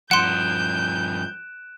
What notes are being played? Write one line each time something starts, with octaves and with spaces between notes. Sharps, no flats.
G2 F3 F#5 C6 F#6 G6 D7 E7